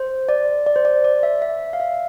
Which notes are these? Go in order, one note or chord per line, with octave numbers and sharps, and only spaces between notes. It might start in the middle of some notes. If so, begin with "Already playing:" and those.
Already playing: C5
D5
D5
C5
D5
D5
E5
E5
F5
E5